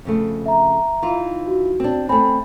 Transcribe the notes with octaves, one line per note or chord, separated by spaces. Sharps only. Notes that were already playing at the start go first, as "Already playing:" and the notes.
F2 C#3 A3
E5 A#5
E3 D#4 F4
F#4
C4 D4
A3 C4 G#5 B5